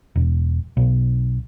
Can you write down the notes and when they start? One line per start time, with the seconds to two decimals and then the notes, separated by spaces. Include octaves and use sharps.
0.16 E1
0.77 B1